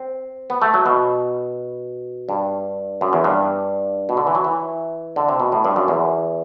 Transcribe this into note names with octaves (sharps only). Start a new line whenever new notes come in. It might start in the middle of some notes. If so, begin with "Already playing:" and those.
Already playing: C4
B3
A3
F#3
B2
G2
F#2
E2
G2
B2
D3
E3
F#3
E3
D3
C3
B2
A2
G2
F#2
E2